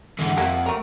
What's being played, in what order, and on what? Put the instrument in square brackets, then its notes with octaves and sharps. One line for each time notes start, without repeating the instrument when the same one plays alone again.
[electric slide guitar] G#2 D3 E3 [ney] F#5
[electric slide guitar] F2 [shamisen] D#3 A#3 E4
[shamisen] A3 A#4